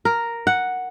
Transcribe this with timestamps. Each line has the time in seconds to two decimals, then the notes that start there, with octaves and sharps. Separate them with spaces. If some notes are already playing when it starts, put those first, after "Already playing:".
0.05 A#4
0.47 F#5